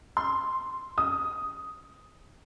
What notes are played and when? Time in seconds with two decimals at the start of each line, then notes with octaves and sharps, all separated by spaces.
0.17 C6
0.98 D#6